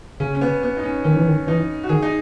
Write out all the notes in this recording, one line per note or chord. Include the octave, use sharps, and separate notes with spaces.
C#3 C#4
C#4
B3
B3
D#4
C#4
D#3 C#4
E3
D#3
E3 D#4
F#4
D#3 G#4
D#4